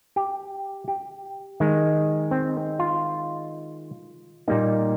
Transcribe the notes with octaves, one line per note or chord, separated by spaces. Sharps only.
G4
G4
D#3 G#3
C4
F4
A#2 G3 A#3 D#4